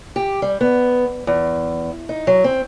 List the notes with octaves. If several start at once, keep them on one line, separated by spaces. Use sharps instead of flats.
G4
G3
B3
E2
D#4
F#3
C4